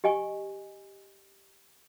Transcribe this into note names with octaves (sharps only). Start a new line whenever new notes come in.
G4 D#5 G#5 C#6